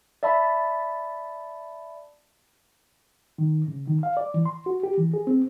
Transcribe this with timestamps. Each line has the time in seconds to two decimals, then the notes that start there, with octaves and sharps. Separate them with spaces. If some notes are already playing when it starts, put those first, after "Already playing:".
0.23 D5 E5 A5 B5
3.38 D#3
3.68 C#3
3.87 D#3
4.03 F5
4.17 D5
4.34 E3
4.46 C6
4.66 F#4
4.83 G4
4.98 E3
5.14 G#4
5.27 C4